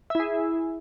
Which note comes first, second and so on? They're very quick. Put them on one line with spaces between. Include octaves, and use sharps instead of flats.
E5 E4 G#4